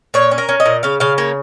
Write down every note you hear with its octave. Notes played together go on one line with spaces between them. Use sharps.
A#2 C#5
C#4
A#4
C#4
D#5
A#2
C#3 F5
C#3 F5
A#3 C#5